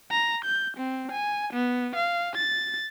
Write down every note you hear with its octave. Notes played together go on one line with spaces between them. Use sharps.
A#5
G6
C4
G#5
B3
F5
A6